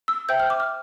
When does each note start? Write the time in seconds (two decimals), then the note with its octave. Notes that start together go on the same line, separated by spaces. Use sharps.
0.08 E6
0.29 C5 E5 G5 G6
0.40 F6
0.50 D6
0.60 F6